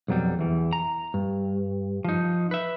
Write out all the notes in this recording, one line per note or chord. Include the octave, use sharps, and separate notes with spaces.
B1 F2 F#3 G3
E2 E3
A#5
G2
F3 D#4
B4 E5